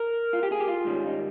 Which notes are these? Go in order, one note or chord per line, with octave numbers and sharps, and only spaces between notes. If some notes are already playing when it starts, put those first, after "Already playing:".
Already playing: A#4
F4
G4
G#4
G4
F4
G#2 D#3 G3 C#4
D#4